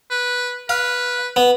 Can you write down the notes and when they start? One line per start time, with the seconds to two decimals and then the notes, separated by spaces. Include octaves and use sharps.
0.10 B4
0.69 B4 F5
1.36 B3